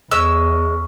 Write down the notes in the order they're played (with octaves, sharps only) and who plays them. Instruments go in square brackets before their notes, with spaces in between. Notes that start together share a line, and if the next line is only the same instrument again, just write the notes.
[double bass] E2 [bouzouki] G#3 [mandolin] C#4 E6